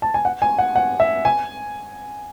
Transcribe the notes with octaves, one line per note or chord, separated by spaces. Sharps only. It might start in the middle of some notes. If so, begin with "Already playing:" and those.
A5
G#5
F#5
G#5
F#5
F#5
E5
G#5